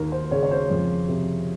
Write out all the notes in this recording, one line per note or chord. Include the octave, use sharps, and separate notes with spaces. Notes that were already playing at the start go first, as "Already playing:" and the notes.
Already playing: D#2 A#4
C5
C#3 C#5
C#5
C5
F2
C3